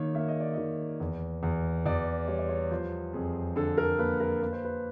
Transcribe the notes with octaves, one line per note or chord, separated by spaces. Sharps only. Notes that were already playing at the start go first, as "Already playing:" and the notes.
Already playing: D#3 A#3 C#5
A#3 E5
D#5
D5
D#3 D#5
E2
E2
E2 D5
G3 C#5
D5
C#5
F3 C5
F2 G#4
D3 A4
A#4
A#3 B4
A#4
A#3 B4
C5
B4